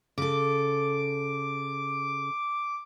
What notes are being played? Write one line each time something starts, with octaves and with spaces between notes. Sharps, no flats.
C#3 A4 D6